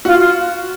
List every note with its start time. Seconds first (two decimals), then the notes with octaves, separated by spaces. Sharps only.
0.05 F4 F#4
0.19 F4